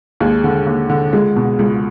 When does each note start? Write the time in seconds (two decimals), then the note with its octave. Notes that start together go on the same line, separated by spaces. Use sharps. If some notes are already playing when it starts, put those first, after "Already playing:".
0.20 D#2 G#3
0.44 D3
0.66 D#2
0.90 D3
1.13 C#2 G#3
1.36 B2
1.59 C#2